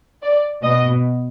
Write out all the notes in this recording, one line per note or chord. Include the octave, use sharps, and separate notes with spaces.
D5
B2 D#5